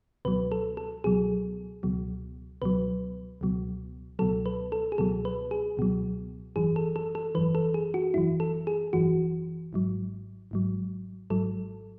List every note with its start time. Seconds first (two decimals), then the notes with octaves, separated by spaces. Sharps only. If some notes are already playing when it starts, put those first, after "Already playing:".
0.25 C#2 B2 F#3 B4
0.52 A4
0.77 A4
1.04 C#2 B2 F#3 G#4
1.83 C#2 B2 F#3
2.62 C#2 B2 F#3 B4
3.41 C#2 B2 F#3
4.19 C#2 B2 F#3 A4
4.46 B4
4.72 A4
4.92 G#4
4.98 C#2 B2 F#3 A4
5.25 B4
5.51 G#4
5.77 C#2 B2 F#3
6.56 G#1 F#2 E3 G#4
6.76 A4
6.96 A4
7.15 A4
7.35 G#1 F#2 E3 B4
7.55 A4
7.74 G#4
7.94 F#4
8.14 G#1 F#2 E3 E4
8.40 A4
8.67 G#4
8.93 G#1 F#2 E3 F#4
9.73 G#1 G#2 F#3
10.51 G#1 G#2 F#3
11.30 G#1 G#2 F#3 A4